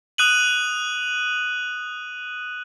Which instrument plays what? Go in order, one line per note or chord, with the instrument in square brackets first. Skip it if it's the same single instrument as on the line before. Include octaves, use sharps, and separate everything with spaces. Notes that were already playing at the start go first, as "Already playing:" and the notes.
[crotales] D#6 F#6 D#7 F#7